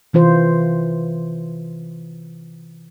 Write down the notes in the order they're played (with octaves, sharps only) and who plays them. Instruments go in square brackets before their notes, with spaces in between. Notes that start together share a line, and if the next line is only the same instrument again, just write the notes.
[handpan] C3 E3 F4 C5